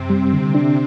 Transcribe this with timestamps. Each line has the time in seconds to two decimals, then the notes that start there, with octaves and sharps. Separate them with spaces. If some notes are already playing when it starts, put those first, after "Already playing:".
Already playing: F#2 C3 C4
0.10 G3
0.33 D3
0.55 D4